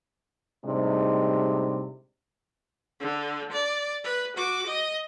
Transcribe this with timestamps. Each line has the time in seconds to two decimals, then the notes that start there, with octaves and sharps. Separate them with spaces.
0.65 A2 C3 G3 G#3 D4 D#4
3.00 D3
3.53 D5
4.04 B4
4.37 F#4 D6
4.67 D#5